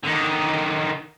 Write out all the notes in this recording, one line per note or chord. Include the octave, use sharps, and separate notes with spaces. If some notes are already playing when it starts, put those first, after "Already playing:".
D3 D#3